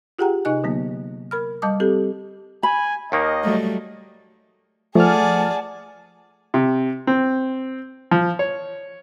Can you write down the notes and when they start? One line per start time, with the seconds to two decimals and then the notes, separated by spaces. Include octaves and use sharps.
0.19 F4 G4 G#4 F#5 G5 A#5
0.45 C3 D#4 D#5 G#5 F#6
0.64 D3 F#3 A#3 B3
1.31 A#4 B5 F6
1.62 G3 D#5 A5 D6 D#6
1.80 C4 G4 A4
2.63 G#5 B5
3.12 D#2 D#3 A#3 D#5
3.44 F#3 G3 A3
4.95 F3 A3 G#4 D5 F#5 G#5 A5 F6
6.54 C3
7.07 C4
8.11 F3
8.39 C#5